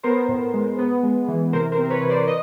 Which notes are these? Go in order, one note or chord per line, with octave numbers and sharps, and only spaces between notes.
B3 A#4 C5
A2
G#3
B3
G#3
E3
C3 A#4 C5
A#4 C5
C4
B4 C#5
C3
C5 D5
D#5